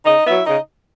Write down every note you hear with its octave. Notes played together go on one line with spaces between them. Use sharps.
C#3 D#4 D#5
F#3 B3 E4 E5
C#3 D#4 D#5